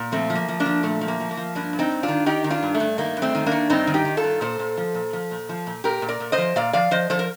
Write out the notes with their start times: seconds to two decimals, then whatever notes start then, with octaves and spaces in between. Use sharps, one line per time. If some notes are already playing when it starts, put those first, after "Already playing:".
Already playing: A#2
0.12 F3 A3 C4
0.30 F3
0.35 A#3
0.48 F3
0.60 A#3 D4
0.66 F3
0.83 A#2 A3
1.01 F3
1.08 A#3
1.20 F3
1.31 A#3
1.37 F3
1.55 G2 A#3 D4
1.73 G2
1.79 C4 D#4
1.91 G2
2.03 D4 F4
2.08 D#3
2.26 D#3 D#4 G4
2.44 D#3
2.50 D4 F4
2.63 G2
2.75 A3
2.80 G2
2.98 D#3 A#3
3.17 G2
3.22 A3 C4
3.35 D#3
3.46 A#3 D4
3.51 D#3
3.70 G2 C4 D#4
3.87 D#3
3.94 D#4 G4
4.05 D#3
4.17 F4 A4
4.24 G2
4.41 A#2 A4 C5
4.59 A#2
4.77 F3
4.95 A#2
5.13 F3
5.31 A#2
5.49 F3
5.67 A#2
5.84 A#2 G4 A#4
6.02 A#2
6.09 A#4 D5
6.20 A#2
6.32 C5 D#5
6.38 F3
6.56 A#2 D5 F5
6.73 F3 D5 F5
6.91 F3 C5 D#5
7.10 F3 A4 C5
7.19 A#4